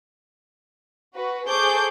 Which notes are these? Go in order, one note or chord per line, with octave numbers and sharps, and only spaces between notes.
F#4 B4
G#4 A4 C5 C#6 D6 G6